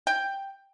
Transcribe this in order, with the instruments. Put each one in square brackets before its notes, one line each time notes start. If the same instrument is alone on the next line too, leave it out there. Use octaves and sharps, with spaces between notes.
[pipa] G5